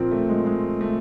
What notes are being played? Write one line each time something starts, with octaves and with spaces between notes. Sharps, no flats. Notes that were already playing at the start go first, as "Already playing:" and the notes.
Already playing: A#2 F3 A#3 C4
A3
G#3
G#3
A3